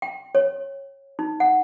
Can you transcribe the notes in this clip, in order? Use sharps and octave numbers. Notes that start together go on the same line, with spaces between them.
G5
C#5
D#4
F#5